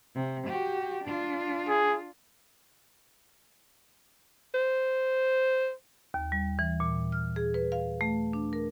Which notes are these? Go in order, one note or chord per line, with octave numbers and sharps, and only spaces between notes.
C3
F#4 G4
D4 F4
G#4
C5
D#2
G3
E3
A#2
F6
G#4
B4
F5
A3
D4
A#4